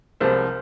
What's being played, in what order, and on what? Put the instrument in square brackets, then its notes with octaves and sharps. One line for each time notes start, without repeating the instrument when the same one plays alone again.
[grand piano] C2 C3 F3 G#3 [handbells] A#4 C5